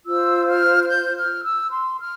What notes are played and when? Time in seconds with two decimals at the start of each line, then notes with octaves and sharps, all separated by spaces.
0.06 F4 C5 E6
0.47 F6
0.84 F6
0.88 G6
1.17 F6
1.45 E6
1.72 C6
2.00 F6